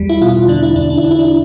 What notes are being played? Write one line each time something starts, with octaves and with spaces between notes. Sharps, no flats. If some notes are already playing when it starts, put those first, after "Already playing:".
Already playing: E2 G3
E4
B2 F4
D3 D4
E4
E2 D4
D4
E4
D3 D4
E4
D4
E4